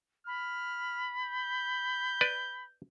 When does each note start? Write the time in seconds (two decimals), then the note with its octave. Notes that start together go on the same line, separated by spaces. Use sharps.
0.27 B5 F6
1.20 G6
2.21 B4 D5